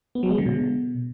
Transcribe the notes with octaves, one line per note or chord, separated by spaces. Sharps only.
B3
F#3
G#3
D3
B2